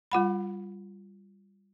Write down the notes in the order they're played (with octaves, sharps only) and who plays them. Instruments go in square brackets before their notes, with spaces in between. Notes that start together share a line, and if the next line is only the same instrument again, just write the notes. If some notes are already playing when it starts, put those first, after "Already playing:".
[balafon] G3 F4 F#5 B5